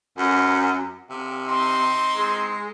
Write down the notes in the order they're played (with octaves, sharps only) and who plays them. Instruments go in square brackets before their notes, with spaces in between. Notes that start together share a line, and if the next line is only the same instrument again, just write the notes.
[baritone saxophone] F#2
C3
[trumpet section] C4 D#4 C6
[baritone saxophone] G#3